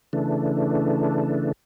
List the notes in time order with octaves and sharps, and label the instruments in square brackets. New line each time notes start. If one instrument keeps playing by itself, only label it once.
[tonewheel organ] C#3 E3 A3 D4